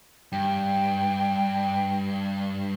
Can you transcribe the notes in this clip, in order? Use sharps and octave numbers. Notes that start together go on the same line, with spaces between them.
G2 G5